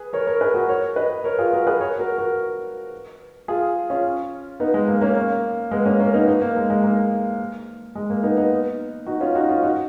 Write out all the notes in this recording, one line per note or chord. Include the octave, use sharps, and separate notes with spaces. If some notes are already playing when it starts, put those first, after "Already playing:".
Already playing: G#4 B4
A#4 C#5
A#4 C#5
G#4 B4
F#4 A#4
A#4 C#5
B4 D#5
A#4 C#5
F4 G#4
F#4 A#4
G#4 B4
A#4 C#5
F#4 A#4
F#4 A#4
F4 G#4
C#4 F4
B3 D#4
G#3
A#3
A#3 C#4
A#3
G#3 B3
A#3 C#4
A#3 C#4
B3 D#4
B3 D#4
A#3
G#3
G#3
A#3
G#3
A#3
B3 D#4
B3 D#4
D#4 F#4
C#4 F4
D#4 F#4
C#4 F4
D#4 F#4